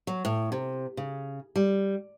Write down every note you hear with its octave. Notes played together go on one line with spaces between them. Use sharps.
F#3
A2
C3
C#3
G3